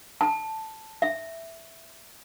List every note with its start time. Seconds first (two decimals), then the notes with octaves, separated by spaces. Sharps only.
0.21 A5
1.02 E5